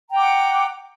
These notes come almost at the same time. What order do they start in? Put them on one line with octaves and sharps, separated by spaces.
A#5 G5 D6 F#5